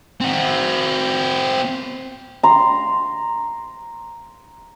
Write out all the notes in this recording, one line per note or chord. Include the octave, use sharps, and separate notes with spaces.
C4 F#4
A#5 C6